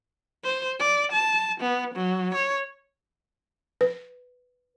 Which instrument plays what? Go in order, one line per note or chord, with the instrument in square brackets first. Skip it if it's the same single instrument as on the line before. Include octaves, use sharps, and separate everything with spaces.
[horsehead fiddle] C5
D5
A5
B3
F#3
C#5
[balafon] B4